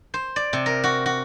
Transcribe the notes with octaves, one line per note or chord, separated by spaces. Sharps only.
C5
D5
C3
A#4
F#4
F#4